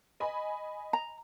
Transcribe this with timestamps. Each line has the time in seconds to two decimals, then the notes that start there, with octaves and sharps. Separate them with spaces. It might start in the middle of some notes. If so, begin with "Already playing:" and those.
0.20 D#5 G#5 B5
0.93 A#5